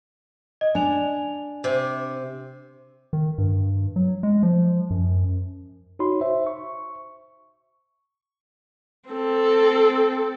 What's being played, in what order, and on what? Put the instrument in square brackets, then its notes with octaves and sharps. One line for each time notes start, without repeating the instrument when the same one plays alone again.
[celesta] D#5
[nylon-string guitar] D4 [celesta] G#5 F7
[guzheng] C3
[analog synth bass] D#3
G2
F#3
G#3
F3
F#2
[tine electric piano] D#4 F#4 C#5 B5 C6
C5 E5
C#6
[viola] C4 A4